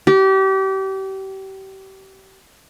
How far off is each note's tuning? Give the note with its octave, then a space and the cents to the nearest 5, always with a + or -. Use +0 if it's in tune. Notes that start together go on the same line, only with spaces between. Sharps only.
G4 -30